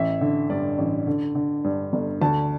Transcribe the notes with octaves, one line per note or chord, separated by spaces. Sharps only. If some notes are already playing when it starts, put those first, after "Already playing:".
Already playing: A1 E5
D3
G2 D5
A1
D3
D3
G2
G1
D2 A5